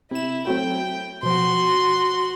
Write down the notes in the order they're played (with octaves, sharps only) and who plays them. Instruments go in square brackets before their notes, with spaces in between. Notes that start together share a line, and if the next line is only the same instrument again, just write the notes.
[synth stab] C3 E7 [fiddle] E4
[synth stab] F#3 A3 C4 [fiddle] G5
[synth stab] B2 F3 [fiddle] F#4 C6